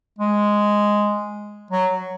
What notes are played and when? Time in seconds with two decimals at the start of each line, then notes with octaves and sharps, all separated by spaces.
0.18 G#3
1.71 F#3